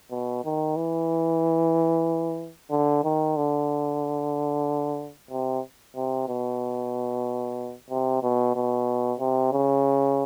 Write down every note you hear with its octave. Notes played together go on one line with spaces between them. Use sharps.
B2
D#3
E3
D3
D#3
D3
C3
C3
B2
C3
B2
B2
C3
C#3